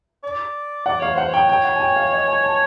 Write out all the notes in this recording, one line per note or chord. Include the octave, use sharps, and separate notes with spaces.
D5
D5 F#5
C#5 F5
C5 F#5
C#5
G5
G5
F#5
G#5
G5
F5
D#5
G#5
A5